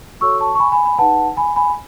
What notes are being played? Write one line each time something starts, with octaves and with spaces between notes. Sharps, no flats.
F#4 A4 C#5 C#6 E6
A5 C#6
C#6
G#5 B5
G#5 B5
G#5 B5
D#4 G#4 B4 F#5 A5
G#5 B5
G#5 B5